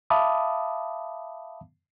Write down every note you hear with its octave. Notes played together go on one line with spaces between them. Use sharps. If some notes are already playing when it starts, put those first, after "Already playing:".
E5 F5 A5 B5 D6 D#6